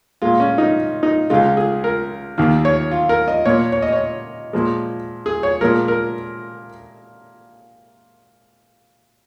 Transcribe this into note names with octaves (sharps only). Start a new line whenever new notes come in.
A#2 G#3 F4
C#4
D#4
D#4
C#2 C#3 G#3 F4
G#4
A#4
D#2 D#3 A#3
C#5
F4
A#4
D#5
A#2 A#3 C#5
C#5
D#5
C#5
A#2 F3 G#3
G#4
C#5
A#2 F3 G#3 A#4
A#4